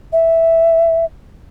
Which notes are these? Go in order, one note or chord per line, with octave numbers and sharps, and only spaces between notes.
E5